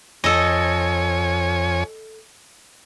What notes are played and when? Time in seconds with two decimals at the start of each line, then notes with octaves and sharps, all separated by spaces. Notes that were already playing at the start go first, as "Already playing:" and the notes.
0.24 F2 A4 C#5 D#5 G#5